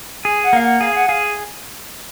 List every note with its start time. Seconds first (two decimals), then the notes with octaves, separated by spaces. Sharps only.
0.25 G#4 G#5
0.43 F#5
0.53 A#3 F5
0.61 F#5
0.81 G#4 F5
0.94 F#5
1.08 G#4 F5